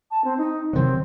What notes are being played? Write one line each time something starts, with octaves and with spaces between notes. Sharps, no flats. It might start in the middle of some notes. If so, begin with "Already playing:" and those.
A5
C4
D#4
C3 D#3 F#3 C4